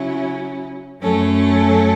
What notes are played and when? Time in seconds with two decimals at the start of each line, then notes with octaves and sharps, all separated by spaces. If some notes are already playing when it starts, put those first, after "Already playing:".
Already playing: C#3 F#3 C#4 E4
1.01 F#2 F#3 A3 C#4 A4